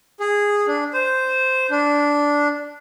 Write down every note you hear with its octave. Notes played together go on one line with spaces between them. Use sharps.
G#4
D4
C5
D4